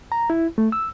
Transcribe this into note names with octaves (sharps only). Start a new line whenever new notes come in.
A#5
E4
A3
E6